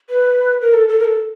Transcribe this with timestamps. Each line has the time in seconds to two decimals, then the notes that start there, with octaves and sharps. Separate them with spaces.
0.10 B4
0.61 A#4
0.74 A4
0.89 A4
0.99 A#4
1.05 A4